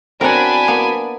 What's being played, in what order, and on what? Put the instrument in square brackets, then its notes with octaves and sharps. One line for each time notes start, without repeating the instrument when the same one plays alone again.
[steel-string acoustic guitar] E2 F#3 C4 [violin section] D4 G#5 B5 [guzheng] A#4 F#5
[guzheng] A#3 B3